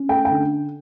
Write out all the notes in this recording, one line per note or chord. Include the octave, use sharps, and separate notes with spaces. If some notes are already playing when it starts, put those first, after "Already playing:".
Already playing: C#4
A3 G5
G5
D3